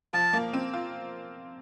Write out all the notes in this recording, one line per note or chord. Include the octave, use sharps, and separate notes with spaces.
F3 A5
A#3
C4
F4